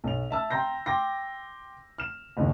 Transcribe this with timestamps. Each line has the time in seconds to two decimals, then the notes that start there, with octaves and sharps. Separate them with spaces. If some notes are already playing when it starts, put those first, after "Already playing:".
0.04 B1 F7
0.31 E5 A5 E6
0.50 G5 A#5 C6 G6 A#6
0.86 G5 C6 D6 A#6
1.98 F6 E7
2.37 F#1 D#2 D#3